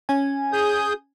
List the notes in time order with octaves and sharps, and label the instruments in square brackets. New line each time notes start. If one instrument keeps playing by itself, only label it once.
[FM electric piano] C#4 G#5
[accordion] G#4 D#6 G6